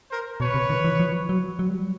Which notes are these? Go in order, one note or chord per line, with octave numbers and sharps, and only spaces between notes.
A#4 C5
B2 B4 C#5
C3
D#3
E3
F3
F#3
F#3
G3
F#3